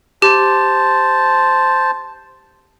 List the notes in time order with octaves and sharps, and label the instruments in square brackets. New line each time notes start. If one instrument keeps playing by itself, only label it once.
[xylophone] G4 [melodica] C5 A5